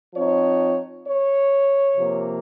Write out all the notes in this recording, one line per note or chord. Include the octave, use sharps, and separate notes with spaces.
F3 C4 D#4 C#5
C#5
C3 F3 A#3